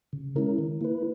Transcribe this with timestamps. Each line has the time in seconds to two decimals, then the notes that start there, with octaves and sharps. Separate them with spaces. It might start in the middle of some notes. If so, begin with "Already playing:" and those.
0.13 C#3
0.36 G#3 C#4 E4 A#4
0.58 D#3
0.81 A#3 E4 B4